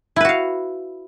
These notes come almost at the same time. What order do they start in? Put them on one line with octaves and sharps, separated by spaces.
E4 B4 F#4 F5